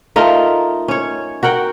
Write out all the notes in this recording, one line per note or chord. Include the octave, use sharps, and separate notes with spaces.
A3 D#4 F4 A#4
C#4 C#5
F#4 A#4 F#5 G5